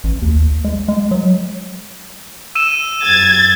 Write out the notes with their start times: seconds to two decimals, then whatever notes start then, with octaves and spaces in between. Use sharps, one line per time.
0.04 A1
0.22 D#2
0.64 G#3
0.88 G#3
1.11 F#3
2.55 E6 D#7 E7
3.04 F#2 G#6 A6